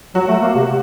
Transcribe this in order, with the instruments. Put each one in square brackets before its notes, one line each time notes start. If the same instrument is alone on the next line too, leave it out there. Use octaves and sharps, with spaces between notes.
[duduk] F#3 [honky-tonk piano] F#4
[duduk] A3
A#3
C3